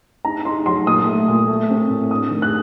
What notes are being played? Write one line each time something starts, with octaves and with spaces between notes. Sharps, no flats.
D#4 A#5
D#4 C6
F#3 C6
A#2 D#6
A3
A#2
A3
C4
A2
D4 D#6
D#3
F#6